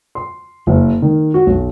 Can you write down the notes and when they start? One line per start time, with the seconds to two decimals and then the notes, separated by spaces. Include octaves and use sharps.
0.15 C6
0.67 F#1
1.02 D#3
1.34 F#4
1.47 B1